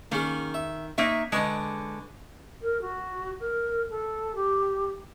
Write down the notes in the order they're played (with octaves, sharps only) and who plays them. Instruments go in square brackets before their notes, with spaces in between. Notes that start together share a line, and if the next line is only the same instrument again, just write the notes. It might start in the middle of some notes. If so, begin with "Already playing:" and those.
[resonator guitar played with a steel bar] D#3 [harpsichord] A#3 C#4 G#4
[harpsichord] E5
[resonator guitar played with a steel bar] A#3 D#4 E5 [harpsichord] C#5
[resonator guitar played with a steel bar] D3 G#3 [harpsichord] D4 B4 C#6
[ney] A#4
F#4
A#4
A4
G4